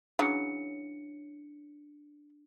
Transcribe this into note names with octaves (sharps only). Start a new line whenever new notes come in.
C#3 E3 F#3 D4 C#7